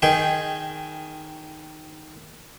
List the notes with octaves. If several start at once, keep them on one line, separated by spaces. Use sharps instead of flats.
D#3 D#4 G#4 G5 C6